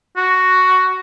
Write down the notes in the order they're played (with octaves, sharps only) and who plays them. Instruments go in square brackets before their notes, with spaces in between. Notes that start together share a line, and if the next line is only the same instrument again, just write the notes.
[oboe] F#4